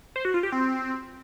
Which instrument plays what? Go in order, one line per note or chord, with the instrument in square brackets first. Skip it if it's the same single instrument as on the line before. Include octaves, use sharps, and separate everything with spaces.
[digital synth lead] C5
F#4
F4
G4
C4